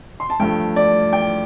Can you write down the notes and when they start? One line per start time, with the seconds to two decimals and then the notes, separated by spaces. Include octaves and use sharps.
0.20 C6
0.30 A5
0.40 G2 F3 A3 G5
0.76 D5
1.13 G5